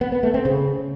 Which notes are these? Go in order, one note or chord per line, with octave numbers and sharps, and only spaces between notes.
B3
B3
A3
C4
C#3